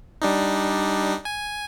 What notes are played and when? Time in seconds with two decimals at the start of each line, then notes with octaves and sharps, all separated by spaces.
0.22 G3 D4 D#4
1.25 G#5